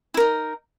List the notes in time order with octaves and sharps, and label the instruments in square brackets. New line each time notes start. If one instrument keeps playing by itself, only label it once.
[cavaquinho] E4
A#4
D#4